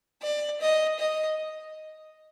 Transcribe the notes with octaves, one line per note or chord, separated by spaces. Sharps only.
D5
D#5
D#5